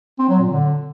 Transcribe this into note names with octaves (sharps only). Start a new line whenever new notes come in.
C4
F#3
A#2
D3